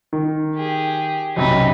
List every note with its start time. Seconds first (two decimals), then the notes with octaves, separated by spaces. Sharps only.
0.13 D#3
0.56 G4 G#4
1.36 B1 F#2 C3 D#4 B5